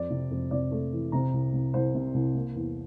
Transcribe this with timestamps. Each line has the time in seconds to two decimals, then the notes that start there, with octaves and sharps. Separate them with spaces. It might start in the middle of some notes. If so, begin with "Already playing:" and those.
Already playing: F2 D5
0.10 C3
0.31 F2
0.51 C3 D5
0.71 A3
0.93 E3
1.12 C3 A#5
1.33 C2
1.53 C2
1.74 C2 C5
1.95 C3
2.14 C2
2.35 A#3
2.56 E2